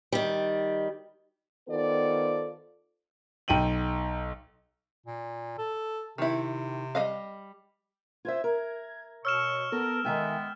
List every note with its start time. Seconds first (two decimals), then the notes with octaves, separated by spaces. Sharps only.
0.12 D#3 G3
1.69 D#3 B3 F4 A4 C5 D5
3.48 B1 G5 D#7 F#7
5.06 A#2
5.58 A4
6.18 C3 D#3 E4
6.95 G3 D#5 F5
8.25 F4 C5 E5 G#6
8.44 A#4
9.25 B2 C#5 C#6 E6 F6 E7
9.72 B3 A4 A#4
10.05 D#3 G#3 B3 E5 G5 G#5